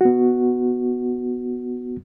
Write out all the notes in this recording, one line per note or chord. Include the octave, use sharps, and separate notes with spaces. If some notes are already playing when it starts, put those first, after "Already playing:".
B3 F#4